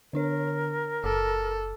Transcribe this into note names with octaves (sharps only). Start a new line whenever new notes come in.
D3 D4 A#4 C#5
F#1 A4 D6 F6